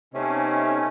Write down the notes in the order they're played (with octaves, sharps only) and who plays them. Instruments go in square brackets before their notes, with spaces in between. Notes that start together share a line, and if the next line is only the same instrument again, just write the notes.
[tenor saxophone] C3 [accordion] A3 C#4 [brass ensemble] B3 D#4